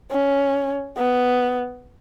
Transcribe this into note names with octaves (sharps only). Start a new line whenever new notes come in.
C#4
B3